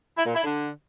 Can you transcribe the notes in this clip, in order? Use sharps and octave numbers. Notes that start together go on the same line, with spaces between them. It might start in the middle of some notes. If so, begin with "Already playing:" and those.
E4
A#2
E4
D3